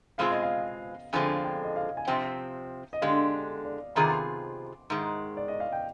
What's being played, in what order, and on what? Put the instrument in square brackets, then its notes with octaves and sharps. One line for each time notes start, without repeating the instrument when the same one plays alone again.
[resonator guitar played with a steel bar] B2 G#3 C4 F4 G#4 [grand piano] F5
[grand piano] D#5
F5
[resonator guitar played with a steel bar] F2 D3 F3 G#3 C4 [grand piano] G#5
[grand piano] G5
D#5
F5
G#5
[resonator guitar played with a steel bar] C3 F3 C4 [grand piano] G5
[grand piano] D#5
[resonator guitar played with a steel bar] D3 G#3 D4 G4 [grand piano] F5
[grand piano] D5
[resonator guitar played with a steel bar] C3 D#3 B3 F4 G#4 [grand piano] C6
[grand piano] D6
C6
[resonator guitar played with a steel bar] G#2 D#3 G#3
[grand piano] D5
D#5
F5
G5